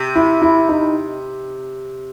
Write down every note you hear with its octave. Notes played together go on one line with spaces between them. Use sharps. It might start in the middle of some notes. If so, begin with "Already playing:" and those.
Already playing: C3
E4
E4
D#4